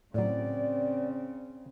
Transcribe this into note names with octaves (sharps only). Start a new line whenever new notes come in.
A2 C#3 F#3 C4 D5